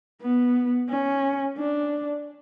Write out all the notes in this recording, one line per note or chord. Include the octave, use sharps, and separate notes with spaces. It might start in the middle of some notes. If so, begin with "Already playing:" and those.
B3
C#4
D4